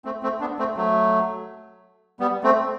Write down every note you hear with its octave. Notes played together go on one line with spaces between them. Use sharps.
A3 C4
A3 C4
B3 D4
A3 C4
F#3 A3
G3 B3
A3 C4